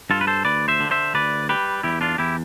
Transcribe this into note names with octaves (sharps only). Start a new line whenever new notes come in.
G2 F4 A4
B4
A4 C5
D2 B4 D5
C5 E5
D3
C5 E5
D2 B4 D5
G3 G4 B4
E2 E4 G4
D4 F4
E2 E4 G4